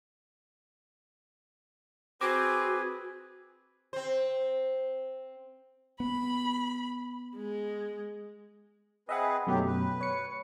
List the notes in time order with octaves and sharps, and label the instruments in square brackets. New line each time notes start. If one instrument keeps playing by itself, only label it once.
[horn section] C4 [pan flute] F#4 [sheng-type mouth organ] G#4 B4 [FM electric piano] D6
[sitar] C4 C5
[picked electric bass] B3 [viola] B5
[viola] G#3
[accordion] C4 G#4 B4 [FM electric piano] D#5 E5 F#5
[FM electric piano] F#2 B2 A3 [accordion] D#3 F#3 G4
[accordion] B4
[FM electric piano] C#5 C#7